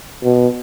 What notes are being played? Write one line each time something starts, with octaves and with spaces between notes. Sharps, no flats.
B2